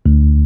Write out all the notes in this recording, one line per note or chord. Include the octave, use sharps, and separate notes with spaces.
D2